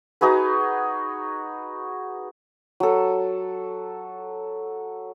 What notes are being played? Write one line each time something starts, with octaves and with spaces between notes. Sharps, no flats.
D#4 F#4 G#4 B4
F#3 A4